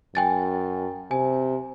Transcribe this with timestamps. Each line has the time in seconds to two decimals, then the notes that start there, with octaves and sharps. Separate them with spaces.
0.15 F#2 G5 G#5 A6
1.11 C3 G#5